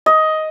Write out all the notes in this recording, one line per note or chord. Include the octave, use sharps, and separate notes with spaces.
D#5